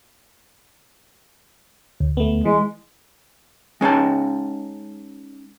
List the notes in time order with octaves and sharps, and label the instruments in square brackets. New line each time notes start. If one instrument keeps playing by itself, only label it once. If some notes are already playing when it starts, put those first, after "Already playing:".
[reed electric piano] D2
[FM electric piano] A3 B3
[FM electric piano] E3 [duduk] G#3
[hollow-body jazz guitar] G#3 C#4 D#4 A5